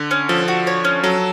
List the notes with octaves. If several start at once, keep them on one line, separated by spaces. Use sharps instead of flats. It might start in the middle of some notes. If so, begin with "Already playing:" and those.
Already playing: D3
C#4
F3 A4
F#4
C#5
C#4
F#3 A4